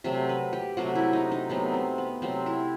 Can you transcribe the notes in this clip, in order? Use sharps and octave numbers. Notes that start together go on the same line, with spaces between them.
C3 F#3 A3 E5
B4
G4
C3 F#3 A3 F#4
E4
D#4
D#4
C3 F#3 A3 B3
C4
B3
C3 F#3 A3 C4
E4